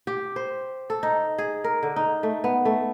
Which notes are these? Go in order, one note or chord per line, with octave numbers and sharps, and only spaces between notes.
G4
C5
A4
D#4
G#4
A#4
D3
D#4
A3
B3
A3